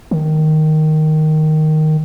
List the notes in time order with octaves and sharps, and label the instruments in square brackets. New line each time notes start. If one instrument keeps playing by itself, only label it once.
[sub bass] D#3